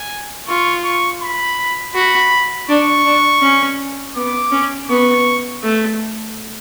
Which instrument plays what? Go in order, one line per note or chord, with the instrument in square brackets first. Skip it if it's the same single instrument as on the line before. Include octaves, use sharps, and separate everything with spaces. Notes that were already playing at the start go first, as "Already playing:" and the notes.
Already playing: [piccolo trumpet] G#5
[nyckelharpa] F4 [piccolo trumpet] C#6
[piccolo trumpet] C#6
B5
[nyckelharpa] F#4 [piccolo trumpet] B5
[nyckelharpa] D4 [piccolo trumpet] C#6
[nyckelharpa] D4
C#4
[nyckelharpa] B3 [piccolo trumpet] D6
[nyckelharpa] C#4
[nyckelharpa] B3 [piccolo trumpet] C#6
[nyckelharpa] A3